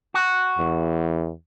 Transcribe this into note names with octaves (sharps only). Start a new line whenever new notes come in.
F#4
E2